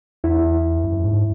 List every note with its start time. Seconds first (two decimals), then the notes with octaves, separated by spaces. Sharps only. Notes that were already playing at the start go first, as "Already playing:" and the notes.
0.24 E2 E4
0.84 F#2
1.04 G#2